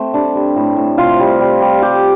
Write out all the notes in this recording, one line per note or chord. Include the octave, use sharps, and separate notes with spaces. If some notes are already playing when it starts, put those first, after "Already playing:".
Already playing: A3 C4
G3 D4
G3
A2
A2
C3 F4
G3
G3
G3
G3 G4